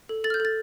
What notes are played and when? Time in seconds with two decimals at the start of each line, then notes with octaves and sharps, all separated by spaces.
0.09 A4
0.24 A4 A6
0.30 F6
0.34 G6
0.40 A4 A6